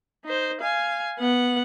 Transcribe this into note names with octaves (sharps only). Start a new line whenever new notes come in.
D#4 C5
F5 G#5
B3 F#5